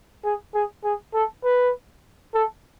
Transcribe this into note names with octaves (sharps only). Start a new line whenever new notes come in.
G#4
G#4
G#4
A4
B4
A4